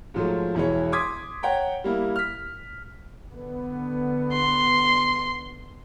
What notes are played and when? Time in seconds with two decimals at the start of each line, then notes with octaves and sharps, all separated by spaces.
0.14 G#2 F3 F#3 A3
0.55 E1 E3 E4 G#4 C#5
0.92 C6 D6 D#6 G#6 B6
1.43 C#5 F#5 G5 A#5
1.84 G3 A#3 E4
2.16 F6 B6
3.30 D3 B3
4.33 C6